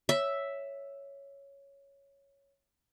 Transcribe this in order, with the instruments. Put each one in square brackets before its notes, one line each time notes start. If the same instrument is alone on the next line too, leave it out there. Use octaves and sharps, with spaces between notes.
[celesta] C#5 [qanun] E5